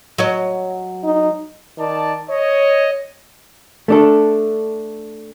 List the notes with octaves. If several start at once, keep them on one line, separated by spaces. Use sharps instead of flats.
F#3 C#5 D#5
D#4
D#3 D5 A5
C#5 D#5
A3 D4 A4